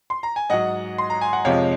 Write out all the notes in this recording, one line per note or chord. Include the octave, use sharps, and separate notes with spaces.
C6
A#5
G#5
G#2 F#3 D#5 F#5
C6
A#5
G#5
F#5
F2 C3 F3 G#3 C#5 F5